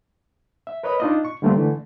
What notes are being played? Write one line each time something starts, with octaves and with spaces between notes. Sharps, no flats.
E5
A#4 B4 C#5 D#5 B5
D4 D#4 F4 D5 D#5
C#6
D3 G3 A3 A#3 C4
D3 E3 A3